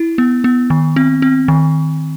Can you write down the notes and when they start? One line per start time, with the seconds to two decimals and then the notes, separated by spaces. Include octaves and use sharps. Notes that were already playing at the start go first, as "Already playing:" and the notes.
Already playing: E4
0.18 B3
0.44 B3
0.70 D#3
0.96 C4
1.22 C4
1.48 D#3